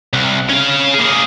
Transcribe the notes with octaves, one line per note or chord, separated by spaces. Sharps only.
C2
C#4 F5
A#3 G#4